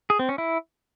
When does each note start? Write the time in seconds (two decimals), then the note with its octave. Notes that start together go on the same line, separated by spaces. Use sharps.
0.10 G#4
0.19 C4
0.29 C#4
0.38 E4